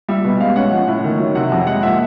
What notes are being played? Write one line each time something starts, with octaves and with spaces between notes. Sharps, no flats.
G3 E5
B2
G#3 F5
C#4 F#5
F3
A2
D#3
F#3
C3 F#5
F2
G#3 F#5
A#2 E5